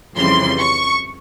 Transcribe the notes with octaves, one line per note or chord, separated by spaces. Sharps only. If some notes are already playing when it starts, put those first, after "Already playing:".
F2 C#3 E3 G3 C6
C#6